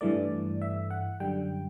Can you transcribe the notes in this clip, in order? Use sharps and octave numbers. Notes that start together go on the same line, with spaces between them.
G2 E3 A3 D5
E5
F#5
F#2 D3 G3 G5